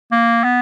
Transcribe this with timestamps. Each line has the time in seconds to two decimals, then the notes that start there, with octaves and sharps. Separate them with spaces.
0.12 A#3
0.44 B3